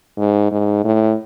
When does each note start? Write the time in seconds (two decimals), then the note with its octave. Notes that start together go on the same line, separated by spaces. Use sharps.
0.17 G#2
0.52 G#2
0.84 A2